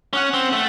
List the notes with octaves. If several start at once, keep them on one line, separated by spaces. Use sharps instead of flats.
C#4 F#5
C4
A3